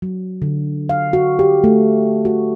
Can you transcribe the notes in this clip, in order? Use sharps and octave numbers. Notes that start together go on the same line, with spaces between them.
F#3
D3
F5
F#4
G4
A3
F#4